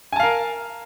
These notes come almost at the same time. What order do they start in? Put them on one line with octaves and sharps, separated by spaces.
G#5 A5 F5 A#4